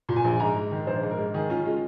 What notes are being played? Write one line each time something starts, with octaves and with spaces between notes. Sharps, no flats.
A#2
G#5
A#1
G#2 A#5
G#3
D#3
A#1 C5
G#2
A#4
G#3
D#3 G#4
C#4 F4
G#3 F4